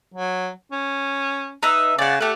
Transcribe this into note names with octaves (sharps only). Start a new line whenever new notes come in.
F#3
C#4
D#4 B4 E5
C#3 D5 F#5
A3 G4 F#5